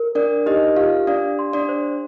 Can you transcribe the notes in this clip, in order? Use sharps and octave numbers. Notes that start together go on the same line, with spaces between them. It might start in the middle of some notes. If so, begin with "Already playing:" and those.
Already playing: A#4
D4 A#4 D5
D#4 G4 D#5
F4 G4 F5
D4 D5 F5
C6
D4 D5
C5